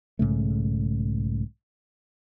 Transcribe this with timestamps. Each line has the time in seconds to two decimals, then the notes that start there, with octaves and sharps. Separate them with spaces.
0.19 B1 G#2 C#3 A3